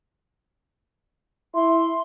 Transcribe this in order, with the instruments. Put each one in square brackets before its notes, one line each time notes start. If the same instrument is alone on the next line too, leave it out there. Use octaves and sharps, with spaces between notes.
[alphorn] E4 [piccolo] C6